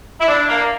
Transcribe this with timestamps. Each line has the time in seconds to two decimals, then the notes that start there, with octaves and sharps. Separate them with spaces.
0.20 E4
0.28 D4
0.48 A#3